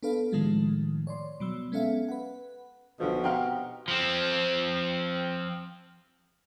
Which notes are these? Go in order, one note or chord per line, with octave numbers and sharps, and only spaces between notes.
B3 D4 A4 B4 F5
A2 D#3 F3 G#3 A3
C#5 D5 C6
B2 F#3 E6
G#3 B3 C#4 A4 E5 F5
B4 F#5
B1 B2 D3 F3
C4 G4 F5 F#5 A#5 F6
F3 C4